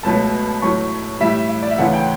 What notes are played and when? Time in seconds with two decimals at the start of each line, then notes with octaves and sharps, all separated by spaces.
0.03 C#2 B2 F#3 A3 A5
0.62 A2 F#3 A3 C#6
1.20 A2 G3 E5
1.49 E5
1.63 D5
1.71 E5
1.78 D2 C#3 E3 A3 F#5
1.93 G5